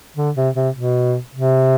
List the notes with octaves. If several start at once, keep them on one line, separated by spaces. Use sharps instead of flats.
D3
C3
C3
B2
C3